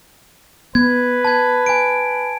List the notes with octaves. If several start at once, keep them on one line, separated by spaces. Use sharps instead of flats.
B3 B4 G#6
A5 G#6
G#5 D7